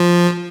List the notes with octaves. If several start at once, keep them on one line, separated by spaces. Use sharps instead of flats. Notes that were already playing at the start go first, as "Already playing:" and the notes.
Already playing: F3